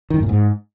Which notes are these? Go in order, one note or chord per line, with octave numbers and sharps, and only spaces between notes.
D#3
G2
A#2
G#2